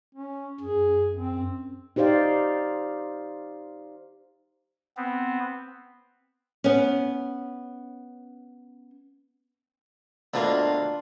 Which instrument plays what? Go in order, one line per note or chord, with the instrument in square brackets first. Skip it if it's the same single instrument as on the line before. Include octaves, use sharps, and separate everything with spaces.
[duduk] C#4
[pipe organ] F#2 [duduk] G#4
[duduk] C4
[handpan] D#4 G4 C5 D5 F5
[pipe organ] B3 C4
[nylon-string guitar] B3 C#4
[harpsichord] D2 B2 A#3 [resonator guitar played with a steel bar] D4 F4